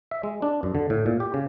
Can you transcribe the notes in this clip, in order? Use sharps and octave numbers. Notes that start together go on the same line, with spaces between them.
E5
G#3
D4
F#2
D3
A2
A#2
G4
C#3